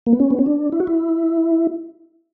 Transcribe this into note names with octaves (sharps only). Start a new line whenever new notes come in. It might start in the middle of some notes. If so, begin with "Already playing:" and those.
A#3
B3
C#4
B3
C#4
D4
E4
F#4
E4